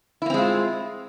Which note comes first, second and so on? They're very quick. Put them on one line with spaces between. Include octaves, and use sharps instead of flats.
E4 A#3 C4 G#3 F4